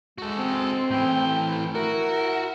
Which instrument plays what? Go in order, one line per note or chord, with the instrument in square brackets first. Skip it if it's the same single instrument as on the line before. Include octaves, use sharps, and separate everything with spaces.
[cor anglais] G#3 [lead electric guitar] F#4 A4
[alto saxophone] C4
[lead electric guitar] A2 E3 [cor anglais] G5
[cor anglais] E4 [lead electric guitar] F#4 [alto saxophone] A#4